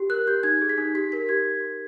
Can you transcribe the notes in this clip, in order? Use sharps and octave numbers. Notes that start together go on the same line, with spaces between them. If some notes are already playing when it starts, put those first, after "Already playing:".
Already playing: G4
A#4 F#6
G4 G6
D#4 G#6
G#4
B6
D#4
G4 B6
A#4 B6
G4 G#6